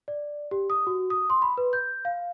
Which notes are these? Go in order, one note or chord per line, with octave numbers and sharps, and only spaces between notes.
D5
G4
D#6
F#4
D#6
C6
B5
B4
G6
F5